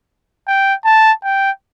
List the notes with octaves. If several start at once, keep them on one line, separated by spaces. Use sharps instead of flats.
G5
A5
G5